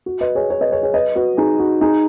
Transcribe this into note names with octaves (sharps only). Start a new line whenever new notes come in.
F#4
B4 D#5
G#4 C#5
G#4 C#5
B4 D#5
G#4 C#5
G#4 C#5
B4 D#5
F#4 B4
D#4 G#4
F#4
D#4 G#4